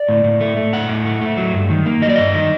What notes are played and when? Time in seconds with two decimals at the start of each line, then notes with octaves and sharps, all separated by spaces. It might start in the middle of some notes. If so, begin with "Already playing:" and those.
Already playing: D5
0.09 A2
0.24 A2
0.41 A3
0.57 A3
0.73 A2 F#5
0.89 A2
1.06 A3
1.22 A3
1.37 F#3
1.53 G2
1.70 D#3
1.86 A#3
2.02 F#3 D#5
2.09 D5
2.16 G2 D#5
2.34 D#3